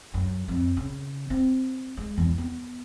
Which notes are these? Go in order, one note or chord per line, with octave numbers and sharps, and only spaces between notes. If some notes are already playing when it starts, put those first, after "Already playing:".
F#2
F2
C#3
C4
G#3
E2
B3